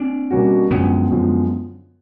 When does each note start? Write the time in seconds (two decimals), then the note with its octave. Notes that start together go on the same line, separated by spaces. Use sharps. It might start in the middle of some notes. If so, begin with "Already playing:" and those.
Already playing: C4 D4
0.31 B2 G3 A#3 C#4 F#4
0.71 F#2 D3 F3 G#3 B3 C#4
1.11 F#2 D3 F3 G#3